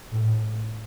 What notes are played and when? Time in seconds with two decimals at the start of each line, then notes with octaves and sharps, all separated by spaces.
0.12 A2